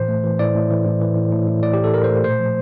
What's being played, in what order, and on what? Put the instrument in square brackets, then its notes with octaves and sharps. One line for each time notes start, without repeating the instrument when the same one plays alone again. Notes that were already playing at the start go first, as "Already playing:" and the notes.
Already playing: [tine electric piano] A2 E3 C5
A3
E3
A2 D5
A2
E3
A2
E3
A2
A2
A2
A2 D5
A2 G4
A4
A2 A#4
C5
A3
A#2 C5
F3